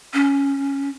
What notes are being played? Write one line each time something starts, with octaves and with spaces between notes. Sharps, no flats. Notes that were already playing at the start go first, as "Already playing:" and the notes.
C#4